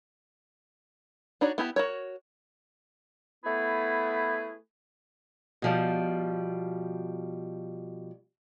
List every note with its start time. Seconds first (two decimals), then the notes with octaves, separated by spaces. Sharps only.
1.41 D4 D#4 F#4 C#5 D5
1.58 B3 E4 G4 A5
1.76 F#4 A#4 C#5
3.44 A3 B3 E4 G#4 B4
5.62 B2 F3 G3